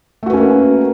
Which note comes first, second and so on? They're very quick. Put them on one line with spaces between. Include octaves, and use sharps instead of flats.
A3 F#4 B4 C#4 A#3